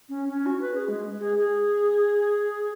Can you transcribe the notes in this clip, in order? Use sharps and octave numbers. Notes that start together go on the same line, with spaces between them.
C#4
C#4
F#4
B4
G#4
G#3
G#4
G#4